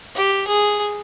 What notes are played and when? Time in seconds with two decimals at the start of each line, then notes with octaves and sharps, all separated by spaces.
0.15 G4
0.47 G#4